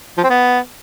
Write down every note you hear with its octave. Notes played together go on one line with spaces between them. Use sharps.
F3
C4
B3